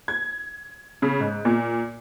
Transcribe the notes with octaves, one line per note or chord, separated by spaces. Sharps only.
G#6
C#3
G#2
A#2